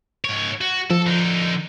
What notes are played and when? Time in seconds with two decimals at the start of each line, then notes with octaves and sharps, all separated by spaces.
0.25 G#2 C#5
0.61 F#4
0.90 F3 A4
1.07 D3 D#4